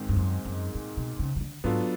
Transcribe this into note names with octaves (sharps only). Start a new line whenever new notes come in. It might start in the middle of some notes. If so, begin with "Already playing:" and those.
Already playing: G#2 D#3 G#3 C4
G2
F#2
F#2
A#2
B2
C#3
D#3
D3
G#2 F#3 B3 D4 F4 A4